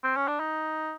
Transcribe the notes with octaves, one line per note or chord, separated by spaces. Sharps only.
C4
C#4
D4
D#4